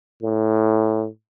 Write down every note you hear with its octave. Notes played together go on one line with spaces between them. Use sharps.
A2